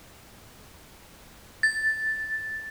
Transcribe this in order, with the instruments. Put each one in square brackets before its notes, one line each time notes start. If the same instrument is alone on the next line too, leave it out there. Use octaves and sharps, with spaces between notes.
[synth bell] A6